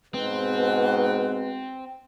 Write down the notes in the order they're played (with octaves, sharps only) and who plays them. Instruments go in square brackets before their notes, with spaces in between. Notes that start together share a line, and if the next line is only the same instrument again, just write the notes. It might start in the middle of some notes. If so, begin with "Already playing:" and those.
[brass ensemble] G#2 B2 [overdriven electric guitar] C4 [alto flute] B4